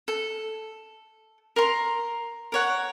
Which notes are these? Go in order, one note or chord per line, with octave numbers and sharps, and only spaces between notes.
A4
A#4 A#5 C6
A#4 C#5 F#5